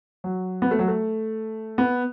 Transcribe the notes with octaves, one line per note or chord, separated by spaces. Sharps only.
F#3
B3
A3
F#3
A3
B3